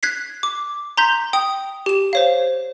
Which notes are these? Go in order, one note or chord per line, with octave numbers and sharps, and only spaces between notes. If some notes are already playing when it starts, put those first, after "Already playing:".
F#6 G#6 B6 C7
D6
A#5 C6 G6 B6
G5 D#6
G4 E7
C5 C#5 F5